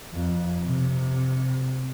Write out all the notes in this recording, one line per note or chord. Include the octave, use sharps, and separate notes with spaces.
F2
C3